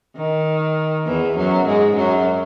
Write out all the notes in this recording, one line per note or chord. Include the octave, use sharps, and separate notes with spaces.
D#3
E2 E3
F#2 F#3
G#2 G#3
F#2 F#3